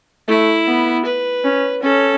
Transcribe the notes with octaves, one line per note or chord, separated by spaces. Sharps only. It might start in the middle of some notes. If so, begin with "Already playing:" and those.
A3 E4
B3
B4
C#4
C#4 A4